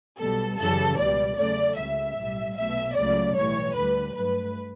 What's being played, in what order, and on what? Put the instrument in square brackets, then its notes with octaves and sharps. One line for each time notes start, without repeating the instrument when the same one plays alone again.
[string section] B1 B2 G3 A4
F#2 C#3 E3 G3 A4
C#2 B2 G3 D5
E2 C#3 F#3 A3 D5
C#2 C#3 G3 E5
B1 A2 G3
B1 B2 A3 E5
C#2 C#3 F#3 A3 D5
B1 A2 E3 G3 C#5
D2 D3 G3 B4
G2 F#3 A3 B4